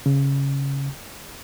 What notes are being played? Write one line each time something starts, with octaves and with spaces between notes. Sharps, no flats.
C#3